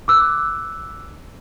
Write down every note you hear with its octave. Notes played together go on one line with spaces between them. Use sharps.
D6 E6 F#6